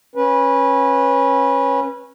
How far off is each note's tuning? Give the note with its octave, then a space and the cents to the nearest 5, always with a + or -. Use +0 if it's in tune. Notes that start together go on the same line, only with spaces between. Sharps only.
C#4 -20 B4 -20